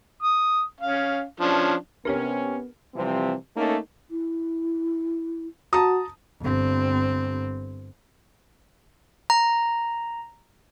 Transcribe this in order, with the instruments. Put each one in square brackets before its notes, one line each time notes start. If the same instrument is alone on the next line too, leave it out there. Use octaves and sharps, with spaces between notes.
[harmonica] D#6
C#4 F5
F3 C#4 D4
[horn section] C3 C#4 [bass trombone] B3 [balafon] D4 G4 C#5 [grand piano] A#4
[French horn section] C3 E3 F3 G3 C4
A3 A#3 C#4 D#4 A4
[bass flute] E4
[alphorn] F#4 [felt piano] A5 A#5 D#6
[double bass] G1 C4
[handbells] A#5